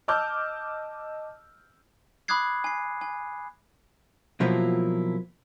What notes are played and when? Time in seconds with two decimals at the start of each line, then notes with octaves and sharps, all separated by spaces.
0.08 D#5 A5 D6 E6 F6 G6
2.28 B5 D6 D#6 F#6 G#6 C7
2.64 G#5 C7
3.01 G#5
4.40 B2 F3 F#3 A#3 E4 F4